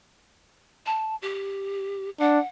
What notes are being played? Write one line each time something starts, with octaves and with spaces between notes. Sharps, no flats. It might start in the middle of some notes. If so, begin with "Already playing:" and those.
A5
G4
D4 F#5